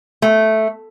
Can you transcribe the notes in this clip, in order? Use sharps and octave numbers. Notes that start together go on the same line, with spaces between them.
A3